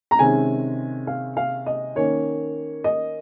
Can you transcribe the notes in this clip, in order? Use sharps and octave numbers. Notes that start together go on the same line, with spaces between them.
A#5
C3 D#3 G#3 C#4 G#5
F5
F5
D#5
D#3 A#3 C#4 C#5
D#5